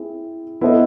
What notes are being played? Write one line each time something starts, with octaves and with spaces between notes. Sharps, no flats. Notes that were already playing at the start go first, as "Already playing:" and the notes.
Already playing: C4 E4 G#4
B3 E4 A4 C5 D#5